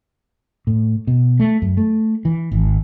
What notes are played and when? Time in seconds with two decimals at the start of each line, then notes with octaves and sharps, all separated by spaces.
0.67 A2
1.07 B2
1.40 A3
1.62 F#2
1.77 A3
2.25 E3
2.52 G#1